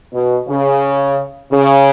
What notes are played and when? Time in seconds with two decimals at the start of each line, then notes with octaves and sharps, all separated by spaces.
0.13 B2
0.48 C#3
1.52 C#3